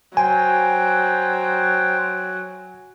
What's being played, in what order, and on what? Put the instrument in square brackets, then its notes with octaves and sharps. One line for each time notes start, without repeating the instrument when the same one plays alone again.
[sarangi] F#3 [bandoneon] C5 G5 [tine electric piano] G#5